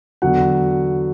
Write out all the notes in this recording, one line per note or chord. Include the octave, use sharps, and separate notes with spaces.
E2 D3 F#3 F#5